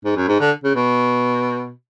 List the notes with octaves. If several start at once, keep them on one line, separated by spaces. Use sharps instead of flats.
G#2
F#2
G#2
D3
C#3
B2